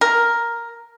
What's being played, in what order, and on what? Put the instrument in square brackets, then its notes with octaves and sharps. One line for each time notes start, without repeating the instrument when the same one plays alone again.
[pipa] A#4